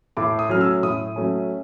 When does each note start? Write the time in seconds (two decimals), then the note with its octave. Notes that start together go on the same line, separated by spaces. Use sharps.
0.17 A2 D6
0.39 D#6
0.49 F#3 A3 C#4 F6
0.61 E6
0.83 A2 D#6
1.16 F#3 A3 C#4